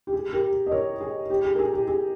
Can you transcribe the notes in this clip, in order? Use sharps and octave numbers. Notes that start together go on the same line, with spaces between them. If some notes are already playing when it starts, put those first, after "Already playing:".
G4
G#4
G4 A#4
D#5
A#4 C#5
G#4
G4
G#4
A#4
G#4
G4
G#4